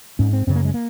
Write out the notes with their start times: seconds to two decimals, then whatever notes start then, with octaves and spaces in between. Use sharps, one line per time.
0.19 G#2 C#4
0.33 C4
0.47 F#2 C#3 C4
0.56 A#3
0.65 G#3
0.74 A#3